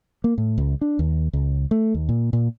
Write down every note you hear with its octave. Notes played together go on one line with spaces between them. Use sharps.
A#3
A2
C#2
D4
D#2
C#2
A3
D#2
A#2
A#2